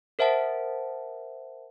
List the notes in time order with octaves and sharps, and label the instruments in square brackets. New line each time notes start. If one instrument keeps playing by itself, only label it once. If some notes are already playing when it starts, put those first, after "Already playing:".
[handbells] A#4 C5 E5 F#5 A5